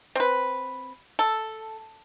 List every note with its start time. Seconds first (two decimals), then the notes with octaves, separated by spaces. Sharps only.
0.15 C4 B4
1.19 A4